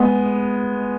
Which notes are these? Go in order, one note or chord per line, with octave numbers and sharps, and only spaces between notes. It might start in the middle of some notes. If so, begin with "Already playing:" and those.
Already playing: G#3 B3